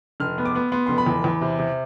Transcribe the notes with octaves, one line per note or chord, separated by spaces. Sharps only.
F1 F6
B3
D6
B3
B3 C6
F1 C6
B5
E2
E2
C3
C3